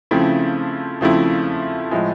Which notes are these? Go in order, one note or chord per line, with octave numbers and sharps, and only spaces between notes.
C#3 F3 A3 C4 E4
C#3 F3 A3 C4 E4
A2 F3 G#3